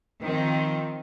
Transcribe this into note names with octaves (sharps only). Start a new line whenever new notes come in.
D#3 F3 C4